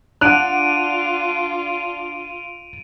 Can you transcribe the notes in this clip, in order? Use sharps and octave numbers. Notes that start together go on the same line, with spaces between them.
D4 F4 F#5 F#6 D7 D#7 F7